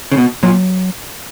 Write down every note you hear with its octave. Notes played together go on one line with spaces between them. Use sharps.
C#3
B2
A#2 F#3